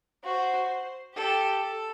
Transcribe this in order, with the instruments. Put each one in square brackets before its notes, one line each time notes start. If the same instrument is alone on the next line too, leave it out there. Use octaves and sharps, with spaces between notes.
[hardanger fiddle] F#4 [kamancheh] C5
[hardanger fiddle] G4 [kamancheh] A4
[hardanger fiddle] A4